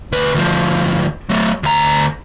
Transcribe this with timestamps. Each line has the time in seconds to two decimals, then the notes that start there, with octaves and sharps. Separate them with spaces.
0.12 D2 B4
0.34 D2 F3
1.29 F#3 A3
1.63 D2 A#5